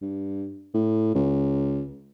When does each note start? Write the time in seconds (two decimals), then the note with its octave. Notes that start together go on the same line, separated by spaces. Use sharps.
0.01 G2
0.74 A2
1.15 C#2